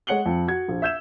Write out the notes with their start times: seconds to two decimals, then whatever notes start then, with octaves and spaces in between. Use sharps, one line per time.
0.07 G#3 C#5 F#5 C#7 F#7 G7
0.26 F2
0.48 F#4 G#6
0.69 A#1
0.82 E5 E6 G6 G#6 E7